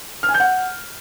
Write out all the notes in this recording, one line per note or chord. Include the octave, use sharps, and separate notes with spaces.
F6
G#5
G6
F#5